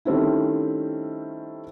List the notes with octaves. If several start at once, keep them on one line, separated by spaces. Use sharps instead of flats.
D#3 G3 A3 C4 C#4 E4